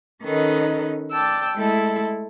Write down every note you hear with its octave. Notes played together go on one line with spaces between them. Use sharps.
D#3 C#4 D#4 A4 B4 D#5
D5 G5 A5 E6
G#3 A3 E4 A4